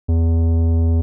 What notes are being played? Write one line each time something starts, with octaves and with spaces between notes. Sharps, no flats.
E2